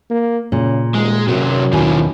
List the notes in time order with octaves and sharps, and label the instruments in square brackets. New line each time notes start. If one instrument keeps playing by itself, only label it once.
[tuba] A#3
[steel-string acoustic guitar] A#2 [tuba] C#3
[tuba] D#1 [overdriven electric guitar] G#3
[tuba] F#2 [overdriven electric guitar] C3 F#3
[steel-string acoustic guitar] D#2 B2 G#5 [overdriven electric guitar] E3 F3